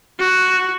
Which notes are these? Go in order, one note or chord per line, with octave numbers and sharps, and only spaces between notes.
F#4